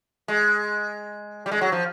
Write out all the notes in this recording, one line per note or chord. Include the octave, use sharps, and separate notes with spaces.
G#3
G3
G#3
F#3
F3